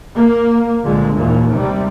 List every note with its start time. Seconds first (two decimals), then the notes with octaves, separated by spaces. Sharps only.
0.17 A#3
0.84 C2 A#2 D3 G#3
1.15 D#2 A#2 E3
1.52 C3 G3